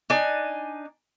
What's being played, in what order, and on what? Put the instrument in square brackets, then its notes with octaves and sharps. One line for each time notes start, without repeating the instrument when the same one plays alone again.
[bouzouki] D4 D#4 G#5